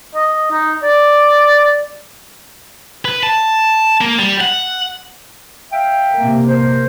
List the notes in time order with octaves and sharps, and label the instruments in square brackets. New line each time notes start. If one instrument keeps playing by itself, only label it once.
[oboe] D#5
D#4
D5
[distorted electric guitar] B4
A5
A#3
G3
F#5
[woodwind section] E5 F5 G5
[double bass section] C3 A#3
[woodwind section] A#4 C5